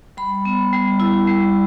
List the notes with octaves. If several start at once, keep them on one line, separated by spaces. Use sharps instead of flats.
G3 B5
B3
G3
E4
G3